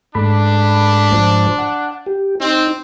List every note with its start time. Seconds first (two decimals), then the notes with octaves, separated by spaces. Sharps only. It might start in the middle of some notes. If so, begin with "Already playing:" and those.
0.15 G#2 A3 D4 B5
1.12 G#2 F3 C5
1.58 F#5
2.06 G4
2.40 C4 D#4